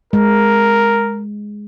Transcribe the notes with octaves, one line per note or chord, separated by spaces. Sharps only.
G#3 A#4